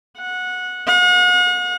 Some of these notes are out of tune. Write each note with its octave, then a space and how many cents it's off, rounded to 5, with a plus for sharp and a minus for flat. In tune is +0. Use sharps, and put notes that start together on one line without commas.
F#5 -15
F#5 -40